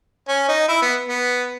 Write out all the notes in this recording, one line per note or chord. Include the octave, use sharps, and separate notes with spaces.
C#4
D#4
E4
B3
B3